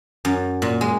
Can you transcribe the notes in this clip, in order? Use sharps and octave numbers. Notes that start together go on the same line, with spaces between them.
F#2
A#2
G#3